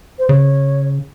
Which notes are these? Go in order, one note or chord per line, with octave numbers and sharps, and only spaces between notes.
C5
C#3 C#5